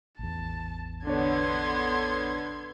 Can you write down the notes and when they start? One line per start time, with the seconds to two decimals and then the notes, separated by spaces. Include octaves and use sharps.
0.19 A1 E2 A5
1.07 D3 B3 D4 C#5 C6 G#6